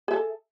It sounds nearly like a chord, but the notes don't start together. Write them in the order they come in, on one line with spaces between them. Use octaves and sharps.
G#4 E5 A4